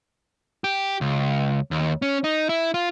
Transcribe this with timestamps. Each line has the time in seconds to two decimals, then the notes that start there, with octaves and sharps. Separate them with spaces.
0.64 G4
1.01 C#2
1.71 D#2
2.02 C#4
2.24 D#4
2.49 E4
2.74 F4